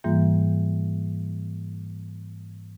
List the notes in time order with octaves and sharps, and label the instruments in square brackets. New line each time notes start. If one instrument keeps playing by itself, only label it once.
[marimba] G#2 E3 G3 A#3 F4